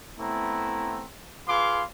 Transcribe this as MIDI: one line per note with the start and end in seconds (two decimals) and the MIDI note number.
0.19 1.05 57
0.19 1.05 59
0.19 1.05 60
0.19 1.05 64
0.19 1.05 82
1.47 1.83 65
1.47 1.83 68
1.47 1.83 71
1.47 1.83 77
1.47 1.83 84
1.47 1.83 86